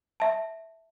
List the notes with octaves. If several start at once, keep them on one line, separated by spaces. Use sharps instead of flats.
E5 A5